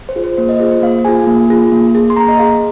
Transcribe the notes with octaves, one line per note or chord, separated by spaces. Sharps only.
C5
F4 G#4
C5
A#3 C5
D#5
F4 G#4 C5
C5
A#3 F5
F4 G#4 G#5
A#3
F4 G#4
A#3
G#4
C6
A#3 A#5
D#5
G#4 F5